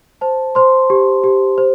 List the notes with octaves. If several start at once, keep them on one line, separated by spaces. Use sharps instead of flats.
C5 A5
C5 C6
G4
G4
C5